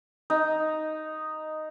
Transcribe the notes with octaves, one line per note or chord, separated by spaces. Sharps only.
D#4